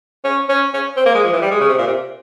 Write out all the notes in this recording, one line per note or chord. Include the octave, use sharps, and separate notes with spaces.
C#4
C#4
C#4
C4
A#3
G#3
F3
E3
G3
G#3
C#3
C3
A#2
C3